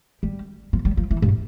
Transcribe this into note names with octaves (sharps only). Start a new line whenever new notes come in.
G3
F3
G3
F3
E3
G2